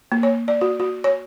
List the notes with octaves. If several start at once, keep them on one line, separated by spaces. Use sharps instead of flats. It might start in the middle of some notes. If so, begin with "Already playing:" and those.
A#3
C#5
D5
F#4
F#4
C#5